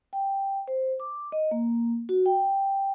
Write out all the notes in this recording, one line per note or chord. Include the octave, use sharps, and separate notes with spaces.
G5
C5
D6
D#5
A#3
F#4
G5